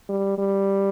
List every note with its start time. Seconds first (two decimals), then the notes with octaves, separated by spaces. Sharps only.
0.09 G3
0.38 G3